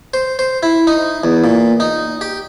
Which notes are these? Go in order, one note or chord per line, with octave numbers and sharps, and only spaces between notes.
C5
C5
E4
D#4
E2
A#2
D#4
G4